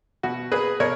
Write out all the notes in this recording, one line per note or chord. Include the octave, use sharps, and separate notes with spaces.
B2 F#4
A#3 G#4 B4
B2 A#4 C#5